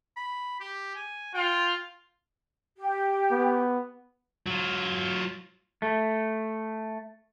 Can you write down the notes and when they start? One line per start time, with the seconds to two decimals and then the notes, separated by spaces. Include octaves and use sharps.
0.17 B5
0.60 G4
0.95 G#5
1.35 F4 G5
2.78 G4
3.31 B3
4.46 F#3 F4
5.82 A3